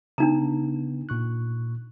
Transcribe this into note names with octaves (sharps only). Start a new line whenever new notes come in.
C#3 B3 D4 D#4 A#5
A#2 C#6 F#6